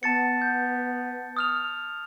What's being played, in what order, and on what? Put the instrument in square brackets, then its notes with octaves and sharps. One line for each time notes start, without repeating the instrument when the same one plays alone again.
[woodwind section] B3 [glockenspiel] A5 A6 C#7
[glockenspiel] G6
D#6 F6 F7